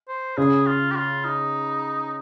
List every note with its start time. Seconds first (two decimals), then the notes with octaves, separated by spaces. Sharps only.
0.09 C5
0.37 C#3 G#4
0.67 F4
0.91 G4
0.96 F4
1.25 D#4